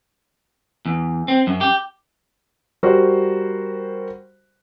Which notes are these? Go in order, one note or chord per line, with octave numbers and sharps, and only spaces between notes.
E2
C4
F#2
G4
G3 F#4 A#4 C5